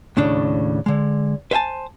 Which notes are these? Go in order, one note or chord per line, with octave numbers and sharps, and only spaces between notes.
D#2 A2 C#3 D4
D3 G#3
B4 C5 E5 G#5 A5